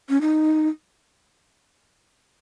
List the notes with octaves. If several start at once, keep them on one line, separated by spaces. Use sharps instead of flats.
C#4
D#4